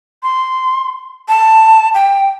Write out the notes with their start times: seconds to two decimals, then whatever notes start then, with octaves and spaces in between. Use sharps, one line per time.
0.23 C6
1.28 A5
1.94 G5